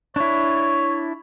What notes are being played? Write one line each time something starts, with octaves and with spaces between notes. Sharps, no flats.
D4 E4 C#5